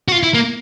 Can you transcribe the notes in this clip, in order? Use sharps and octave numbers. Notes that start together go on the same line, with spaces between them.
F#4
F4
E4
A#3